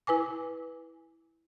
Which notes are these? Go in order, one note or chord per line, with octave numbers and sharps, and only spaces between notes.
E4 B4 G#5 D6